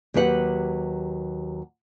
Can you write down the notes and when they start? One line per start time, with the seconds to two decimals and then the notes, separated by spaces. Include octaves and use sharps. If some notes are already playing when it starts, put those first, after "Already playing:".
0.14 D#2 F#3 G4 B4 F#5